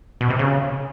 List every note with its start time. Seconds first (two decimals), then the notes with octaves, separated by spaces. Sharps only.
0.21 B2
0.30 C3
0.39 C#3